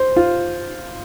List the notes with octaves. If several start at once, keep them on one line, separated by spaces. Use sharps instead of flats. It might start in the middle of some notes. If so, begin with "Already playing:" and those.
Already playing: C5
F4